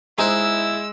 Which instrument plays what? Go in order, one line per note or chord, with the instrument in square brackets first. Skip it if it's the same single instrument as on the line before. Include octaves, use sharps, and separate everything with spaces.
[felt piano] G#3 [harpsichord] D#4 C5 [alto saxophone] E4 [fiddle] E6